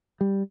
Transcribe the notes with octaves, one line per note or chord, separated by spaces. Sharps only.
G3